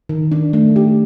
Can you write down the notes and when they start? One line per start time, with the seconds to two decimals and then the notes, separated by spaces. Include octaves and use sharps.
0.09 D#3
0.32 D4
0.53 A3
0.76 G4